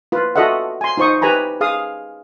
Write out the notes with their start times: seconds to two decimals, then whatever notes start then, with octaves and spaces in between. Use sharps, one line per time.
0.12 F4 B4
0.36 F4 F#4 A4 D#5 E5 F#5
0.81 G#5 C6
0.97 D#4 F4 C5 C#6 D#6
1.22 G4 B4 G#5 A#5 B5
1.61 G#4 F5 D#6